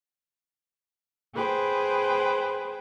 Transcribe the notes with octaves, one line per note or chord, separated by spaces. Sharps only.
G#4 B4 C5 G5